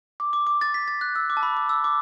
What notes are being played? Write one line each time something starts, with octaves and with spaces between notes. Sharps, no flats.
D6
D6
D6
A6
B6
A6
F#6
E6
D6
A5
B5
D6
E6
D6